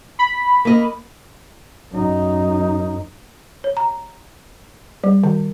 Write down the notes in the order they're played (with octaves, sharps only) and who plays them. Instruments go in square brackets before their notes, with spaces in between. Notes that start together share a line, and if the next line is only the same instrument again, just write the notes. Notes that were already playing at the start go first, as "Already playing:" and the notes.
[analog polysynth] B5
[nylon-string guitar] A#3 D#5
[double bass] F#2 D#4
[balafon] C#5
A#5
G3
D#3